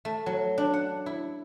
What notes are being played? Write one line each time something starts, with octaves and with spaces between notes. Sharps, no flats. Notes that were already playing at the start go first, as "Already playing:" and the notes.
A3
F#3
D4
F#5
E4